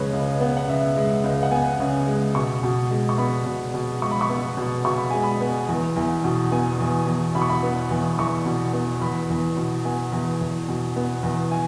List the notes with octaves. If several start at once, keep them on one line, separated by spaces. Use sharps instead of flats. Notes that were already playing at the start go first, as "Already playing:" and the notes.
Already playing: C#2 C#3 G#3 B4 C#5
C#2
B3
F#5
C#3 E5
G#3
C#2
F#5
B3 G#5
C#3
G#3
B2 C#6
B2
G#3
C#6
B3 B5
B2
B2
G#3 C#6
B5
C#6
B3
B2
B2 C#6
B5
G#3 G#5
B5
B3
E2
E2
B2
B3 G#5
E2
E2
B2 B5
C#6
B5
B3
E2
E2 C#6
B2
B3
E2 B5
E2
B2
B3 G#5
E2
E2
B2
B3
E2
G#5